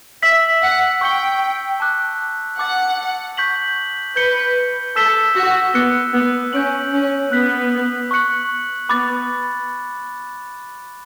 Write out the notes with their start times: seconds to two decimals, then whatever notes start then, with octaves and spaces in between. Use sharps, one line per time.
0.23 E5 E6 B6 F#7
0.62 F#5
1.01 G5 C#6 G6 C#7 G7
1.80 A5 D6 F#6
2.59 F#5 A5 D6 A6
3.37 C#6 G6 B6 F#7
4.16 B4 G6 C#7 G7
4.96 A4 E6 B6 E7 G7
5.36 F#4
5.74 B3 D6 F#6 C#7 G7
6.14 B3
6.53 C#4 G6 D7 F#7
6.93 C#4
7.32 B3 F#6 B6 F#7
8.11 C#6 F#6 C#7 F#7
8.89 B3 B5 D6 A6